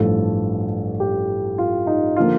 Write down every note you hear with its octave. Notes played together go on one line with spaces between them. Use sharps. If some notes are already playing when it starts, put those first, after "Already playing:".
Already playing: A1 G2 F3 A3 A4
G4
F4
D#4
D3 F3 A#3 F4